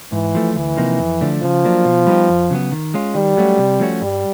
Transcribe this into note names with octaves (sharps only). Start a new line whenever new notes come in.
G#2 E3
F3 A3
D2 E3
C3 F3 A#3 D#4
F2
D3 F3 A3 D4
C#3 F3
F#3 A#3 D4
B2
G3 B3 D#4 G4
F2
C#3 F#3 B3
D#3
G#3 C#4 F4
D#3 G3
F#3 A3 C#4 F#4
C3
F3 A3 C#4 F#4
G2 G3